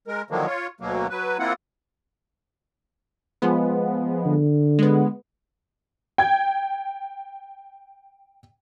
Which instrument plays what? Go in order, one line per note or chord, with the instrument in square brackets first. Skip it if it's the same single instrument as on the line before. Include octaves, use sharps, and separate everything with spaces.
[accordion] G#3 A#4
D3 D#3 F3 F#3 G#3 A#3
F4 C#5
D2 B2 F#3 A#3
F#3 B4
A#3 C4 E4 F4 F#5
[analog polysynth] F3 G#3 B3
[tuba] D3
[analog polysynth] G#3 B3
[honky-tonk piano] G5 G#6